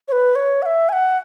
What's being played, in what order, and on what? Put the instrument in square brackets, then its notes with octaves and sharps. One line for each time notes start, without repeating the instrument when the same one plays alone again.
[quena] C#5
B4
C#5
F#5
E5
G#5
F#5